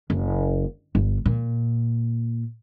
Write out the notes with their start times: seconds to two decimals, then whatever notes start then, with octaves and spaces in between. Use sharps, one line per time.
0.10 F#1
0.95 G1
1.26 A#2